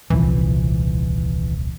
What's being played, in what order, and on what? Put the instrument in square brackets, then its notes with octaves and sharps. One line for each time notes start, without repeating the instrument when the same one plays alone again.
[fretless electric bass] D#1 C2 F3 [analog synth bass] E3